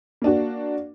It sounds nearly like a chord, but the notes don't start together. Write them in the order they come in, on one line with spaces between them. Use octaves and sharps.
A#3 D4 F#4